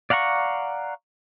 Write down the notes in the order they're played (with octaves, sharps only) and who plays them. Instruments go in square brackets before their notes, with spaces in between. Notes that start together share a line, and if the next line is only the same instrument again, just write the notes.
[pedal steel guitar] D5 F5 F#5 A#5 C#6